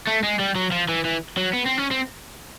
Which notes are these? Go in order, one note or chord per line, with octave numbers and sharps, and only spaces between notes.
A3
G#3
G3
F#3
F3
E3
E3
F#3
B3
C4
C#4
C4